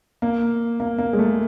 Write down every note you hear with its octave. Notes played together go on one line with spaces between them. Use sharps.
A#3
A#3
A#3
G#3
A3